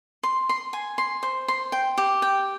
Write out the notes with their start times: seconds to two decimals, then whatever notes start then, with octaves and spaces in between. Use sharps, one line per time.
0.23 C6
0.49 C6
0.73 G#5
0.98 C6
1.23 C5
1.48 C6
1.72 G5
1.98 G4
2.22 G5